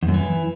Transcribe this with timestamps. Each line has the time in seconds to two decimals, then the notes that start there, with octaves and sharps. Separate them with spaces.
0.03 E2
0.08 F#2
0.14 E3